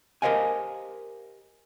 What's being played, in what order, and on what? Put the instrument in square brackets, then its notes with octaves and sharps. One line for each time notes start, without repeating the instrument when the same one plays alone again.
[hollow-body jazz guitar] G4 A#4 C5 D#5 F5 G#5